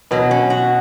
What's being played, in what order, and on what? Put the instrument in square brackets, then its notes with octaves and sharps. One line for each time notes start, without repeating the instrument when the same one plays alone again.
[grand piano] B2 [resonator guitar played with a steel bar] F#3
[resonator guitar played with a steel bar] C#4
F#4